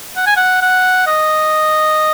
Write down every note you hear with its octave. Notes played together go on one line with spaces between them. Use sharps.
F#5
G#5
F#5
F#5
D#5